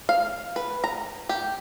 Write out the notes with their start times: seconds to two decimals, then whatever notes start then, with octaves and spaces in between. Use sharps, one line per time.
0.09 F5
0.56 B4
0.84 A#5
1.29 G4